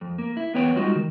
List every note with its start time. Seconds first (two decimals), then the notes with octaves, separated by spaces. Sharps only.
0.01 F2
0.18 A#3
0.37 E4
0.54 E2 B3 B4 C#5 G5
0.76 G3 G#3 D#4 F4 F#4
0.96 D#3